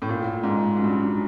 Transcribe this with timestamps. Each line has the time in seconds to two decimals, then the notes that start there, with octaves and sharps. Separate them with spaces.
0.02 A2
0.09 A#2
0.43 G#2
0.77 F#2
0.84 G2
0.92 F#2